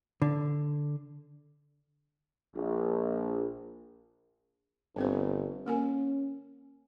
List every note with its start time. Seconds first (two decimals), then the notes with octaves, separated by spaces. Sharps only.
0.22 D3
2.57 A#1
4.96 G1 D3 C4 C5
5.66 A#3 C#4 A#4 G#5